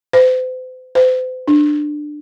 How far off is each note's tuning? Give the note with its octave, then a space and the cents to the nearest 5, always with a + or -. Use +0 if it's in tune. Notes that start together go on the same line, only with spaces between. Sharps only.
C5 -40
C5 -40
D4 +15